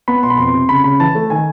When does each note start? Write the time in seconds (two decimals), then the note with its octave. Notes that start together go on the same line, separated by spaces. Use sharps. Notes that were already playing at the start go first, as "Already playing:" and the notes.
0.08 B3 B5
0.23 B2 C6
0.30 B5
0.37 F2 C6
0.54 C3
0.69 C#3 B5
0.84 C#3 B5
1.00 E3 A5
1.15 A3
1.30 D#3 G#5